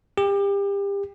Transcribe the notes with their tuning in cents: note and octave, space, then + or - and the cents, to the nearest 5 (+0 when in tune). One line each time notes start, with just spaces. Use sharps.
G4 +30